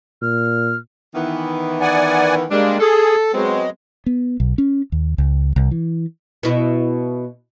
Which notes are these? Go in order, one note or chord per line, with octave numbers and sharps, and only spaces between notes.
A#2 F6
D#3 E3 B3
D5 F#5 G#5
G3 G#3 A#3 D4
G#4 A4
F#3 G#3 B3 C4
B3
B1
C#4
D#2
C#2
C2
E3
B2 E4